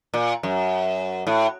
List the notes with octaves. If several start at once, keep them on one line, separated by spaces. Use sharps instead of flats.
A#2
F#2
A2